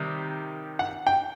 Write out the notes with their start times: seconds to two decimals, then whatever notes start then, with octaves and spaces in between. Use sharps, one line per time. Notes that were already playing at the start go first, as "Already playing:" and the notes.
Already playing: C3 D#3 G3
0.79 F#5
1.07 G5